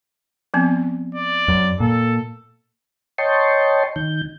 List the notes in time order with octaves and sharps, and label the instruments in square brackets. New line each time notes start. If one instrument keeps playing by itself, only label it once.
[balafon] F3 B3 C4
[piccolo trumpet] D5
[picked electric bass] F#2
[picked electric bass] A#2 [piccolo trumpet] A4
[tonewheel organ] C#5 D#5 G5 A5 C6 C#6
D#3 G6